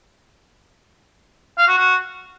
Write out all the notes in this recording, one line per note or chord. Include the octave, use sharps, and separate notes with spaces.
F5
F#4
F#4